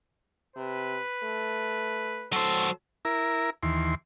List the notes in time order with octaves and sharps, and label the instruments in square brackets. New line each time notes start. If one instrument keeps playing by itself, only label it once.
[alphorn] C3 [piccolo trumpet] B4
[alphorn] A3
[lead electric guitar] F#3 C5 [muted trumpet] A4
[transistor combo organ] E4 A#4
D#2 E3 C6